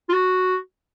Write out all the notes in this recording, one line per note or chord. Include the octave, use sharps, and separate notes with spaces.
F4
F#4